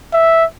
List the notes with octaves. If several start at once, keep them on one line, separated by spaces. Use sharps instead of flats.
E5